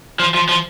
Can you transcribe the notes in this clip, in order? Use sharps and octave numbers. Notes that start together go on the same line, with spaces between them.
F3
F3
F3